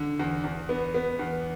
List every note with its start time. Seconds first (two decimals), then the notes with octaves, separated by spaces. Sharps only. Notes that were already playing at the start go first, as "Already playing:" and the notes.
Already playing: D3
0.20 E2
0.44 E2
0.69 B3
0.95 B3
1.19 E2